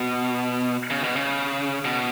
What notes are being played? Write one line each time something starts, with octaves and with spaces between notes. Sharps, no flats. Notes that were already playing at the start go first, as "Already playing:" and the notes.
Already playing: B2
C#3
B2
C#3
B2